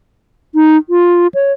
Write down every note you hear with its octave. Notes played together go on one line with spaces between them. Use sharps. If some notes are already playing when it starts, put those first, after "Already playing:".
D#4
F4
C#5